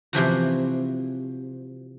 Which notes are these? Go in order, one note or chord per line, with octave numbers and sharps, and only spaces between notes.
C3 E3 F3 F#4